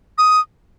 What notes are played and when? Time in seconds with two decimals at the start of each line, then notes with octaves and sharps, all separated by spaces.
0.18 D#6